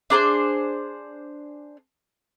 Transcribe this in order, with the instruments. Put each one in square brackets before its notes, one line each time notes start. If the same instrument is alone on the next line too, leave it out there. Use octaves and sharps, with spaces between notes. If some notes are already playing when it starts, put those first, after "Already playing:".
[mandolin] D4 G#4 B4 C5